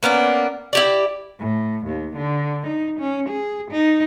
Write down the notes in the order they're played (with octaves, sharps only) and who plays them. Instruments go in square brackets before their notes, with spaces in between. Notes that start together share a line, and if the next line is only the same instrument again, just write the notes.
[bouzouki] A#3 B3 C#4 D4
E4 G4 D5
[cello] A2
D#2
D3
D#4
C#4
G#4
D#4